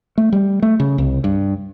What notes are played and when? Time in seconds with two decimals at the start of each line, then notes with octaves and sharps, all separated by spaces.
0.18 A3
0.33 G3
0.63 A3
0.80 C#3
0.98 C2
1.24 G2